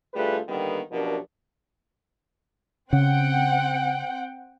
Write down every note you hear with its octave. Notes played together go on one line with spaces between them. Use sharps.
D2 G3 A3 F4 G#4 B4
D3 D#3 G3 A#3 B3
F#2 B2 F3 D4 G4 A#4
C#3 C4 F#5 G5